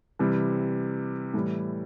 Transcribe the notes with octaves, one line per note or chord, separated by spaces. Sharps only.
C3 E3 G3
A2 E3 G3